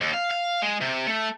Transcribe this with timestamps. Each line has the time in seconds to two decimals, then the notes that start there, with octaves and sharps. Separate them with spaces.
0.01 D#2
0.14 F5
0.31 F5
0.63 G#3
0.81 C3
1.07 A3